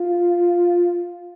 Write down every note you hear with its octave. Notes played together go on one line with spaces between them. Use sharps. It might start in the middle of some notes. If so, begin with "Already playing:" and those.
Already playing: F4